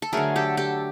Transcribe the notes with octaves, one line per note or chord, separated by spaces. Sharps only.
A4
D3 F#3 A3 G#4 A#4
G4 A4
G4 A4